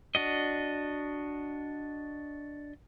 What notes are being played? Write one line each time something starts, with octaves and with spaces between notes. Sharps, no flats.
D4 F#4 D#5